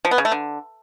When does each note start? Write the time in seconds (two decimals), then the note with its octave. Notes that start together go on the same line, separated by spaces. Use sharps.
0.05 F3
0.11 B3
0.18 C#3
0.25 A3
0.32 D3